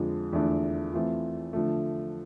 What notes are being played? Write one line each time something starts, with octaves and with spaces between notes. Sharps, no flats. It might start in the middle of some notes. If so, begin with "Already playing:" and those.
Already playing: F2 D3 F3 G#3
E2 D3 F3 A3 D4
E3 A3 C4 F4
D3 F3 A3